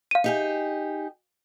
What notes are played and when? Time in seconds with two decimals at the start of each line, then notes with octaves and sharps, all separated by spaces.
0.11 F5 D#7
0.24 D#4 G4 G#4